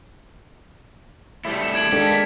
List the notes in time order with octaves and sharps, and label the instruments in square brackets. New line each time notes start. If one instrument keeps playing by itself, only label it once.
[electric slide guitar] G3 A3 E4
[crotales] C#7 E7
G#6 D7 F#7
[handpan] G#3 D4 A4 [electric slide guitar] A#3 G4
[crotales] B6